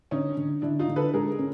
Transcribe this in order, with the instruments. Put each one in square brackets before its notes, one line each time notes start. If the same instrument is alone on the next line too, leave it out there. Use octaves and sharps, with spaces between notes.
[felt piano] D3 [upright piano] C#4 D#4
[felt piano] D3
[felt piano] D3 [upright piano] D4 E4
[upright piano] D#4 F4
[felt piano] D3
[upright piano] A4 B4
[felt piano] G#3 [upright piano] G#4 A#4
[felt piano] C#4